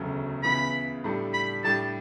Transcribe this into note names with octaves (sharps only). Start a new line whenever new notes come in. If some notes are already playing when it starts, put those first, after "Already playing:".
Already playing: E1 D2 C#3 F#3 A3
C#2 C#3 E3 B3 B5
A2 G3 D4 A4
B5
A2 G3 D4 G4 A5